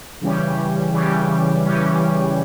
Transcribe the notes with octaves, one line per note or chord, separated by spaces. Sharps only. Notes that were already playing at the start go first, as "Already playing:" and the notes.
C#3 E3 G3 C#4 G4
C#3 E3 G3 C#4 G4
C#3 E3 G3 C#4 G4